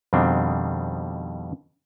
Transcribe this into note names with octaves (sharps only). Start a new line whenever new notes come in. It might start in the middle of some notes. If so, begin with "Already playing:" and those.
F2 B2 D#3 G3 C4 D4